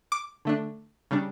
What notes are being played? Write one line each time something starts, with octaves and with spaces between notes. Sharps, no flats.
D6
D3 A3 D4
C#3 G3 D4